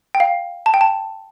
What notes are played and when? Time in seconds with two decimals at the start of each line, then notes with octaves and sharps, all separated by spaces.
0.15 G5
0.20 F5
0.66 A5
0.74 G5
0.81 A5